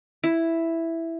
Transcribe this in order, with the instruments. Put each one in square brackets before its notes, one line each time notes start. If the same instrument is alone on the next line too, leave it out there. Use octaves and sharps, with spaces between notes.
[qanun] E4